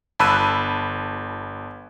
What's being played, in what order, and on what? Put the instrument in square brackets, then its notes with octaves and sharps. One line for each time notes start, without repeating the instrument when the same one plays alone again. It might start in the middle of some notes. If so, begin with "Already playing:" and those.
[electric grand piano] G1 A5 B5 E6 F#6 D#7